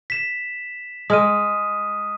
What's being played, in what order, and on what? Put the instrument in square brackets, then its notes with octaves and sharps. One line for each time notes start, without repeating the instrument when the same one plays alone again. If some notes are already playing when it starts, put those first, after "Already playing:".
[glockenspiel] B6 E7
[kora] G#3 [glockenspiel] D#6 F6 D#7